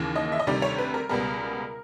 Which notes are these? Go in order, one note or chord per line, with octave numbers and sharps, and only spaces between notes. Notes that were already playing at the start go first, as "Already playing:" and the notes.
Already playing: D#2 C#3 E3
D#5
E5
D#5
D2 C3 D#3 G3 D5
C#5
B4
A#4
C#2 B2 G3 B3 A#4